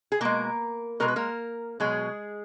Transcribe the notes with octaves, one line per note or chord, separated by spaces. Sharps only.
G#4
B2 G#3 A#3 A#4
B2 G#3 A#4
B4
A#3 A#4
B2 F#3 G#3 G#4